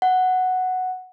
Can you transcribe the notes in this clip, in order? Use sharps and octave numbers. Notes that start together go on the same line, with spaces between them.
F#5